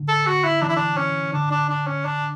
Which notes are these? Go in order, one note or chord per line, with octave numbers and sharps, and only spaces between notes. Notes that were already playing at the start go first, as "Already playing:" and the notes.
Already playing: D3
A4
F#4
E4
E3 D4
E4
D4
C#4
D3 D4
D4
D4
C#4
D4